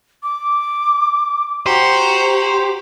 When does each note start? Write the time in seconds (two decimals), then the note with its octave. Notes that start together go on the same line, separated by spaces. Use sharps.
0.23 D6
1.66 F#4 G4 C5 A#5